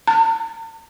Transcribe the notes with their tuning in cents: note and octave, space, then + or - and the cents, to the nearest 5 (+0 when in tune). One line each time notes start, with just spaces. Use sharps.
A#5 -45